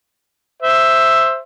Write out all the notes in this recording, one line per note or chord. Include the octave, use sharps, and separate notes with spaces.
C5 E5